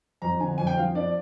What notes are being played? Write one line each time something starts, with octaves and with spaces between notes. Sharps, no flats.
F2 A#5
D3 G#5
F2 G#5
G5
F3 F5
D4 D5